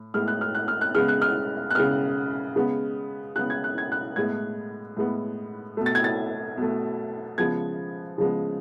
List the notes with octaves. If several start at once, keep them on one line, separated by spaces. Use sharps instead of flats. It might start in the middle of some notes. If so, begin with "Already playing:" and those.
Already playing: A2
A2 G#3 B3 F6
F#6
F6
F#6
F6
F#6
C#3 G#3 B3 F6
F#6
F6
F#6
C#3 G#3 B3 F6
C#3 G#3 B3
C#3 G#3 B3 F#6
G#6
F#6
G#6
F#6
A2 G#3 B3 G#6
A2 G#3 B3
B2 A3
A6
G#6
A6
B2 A3
C#3 F3 G#3 B3 G#6
C#3 F3 G#3 B3